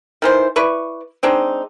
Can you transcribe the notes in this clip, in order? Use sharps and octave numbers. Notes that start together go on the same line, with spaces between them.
D#3 E3 C5
E4 B4 D5 C#6
G#3 C4 D4 D#4